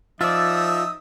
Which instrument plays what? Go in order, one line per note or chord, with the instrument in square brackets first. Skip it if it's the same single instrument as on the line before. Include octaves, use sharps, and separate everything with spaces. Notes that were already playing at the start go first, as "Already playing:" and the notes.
[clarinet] F3 [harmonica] D#4 E5 D#6 [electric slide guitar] F4 D5 [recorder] E6